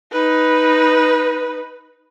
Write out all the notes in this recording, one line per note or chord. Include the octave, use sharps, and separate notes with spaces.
D#4 B4